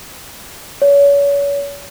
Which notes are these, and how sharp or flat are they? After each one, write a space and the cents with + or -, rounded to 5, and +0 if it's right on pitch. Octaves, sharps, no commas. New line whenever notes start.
C#5 +35